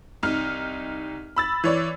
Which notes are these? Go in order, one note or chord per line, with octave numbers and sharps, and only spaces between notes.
C2 D#4 F6
B5 E6 A6
E3 C#5 D5